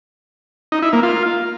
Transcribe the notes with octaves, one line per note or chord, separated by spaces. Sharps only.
D#4
E4
A#3
F4